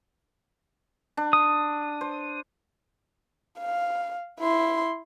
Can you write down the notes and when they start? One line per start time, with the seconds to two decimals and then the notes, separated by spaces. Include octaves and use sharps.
1.17 D4
1.33 D#6
2.01 C5
3.60 F5
4.40 E4 C6